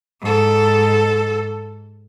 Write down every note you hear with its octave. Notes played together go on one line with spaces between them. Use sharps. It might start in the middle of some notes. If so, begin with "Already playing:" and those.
G#2 A4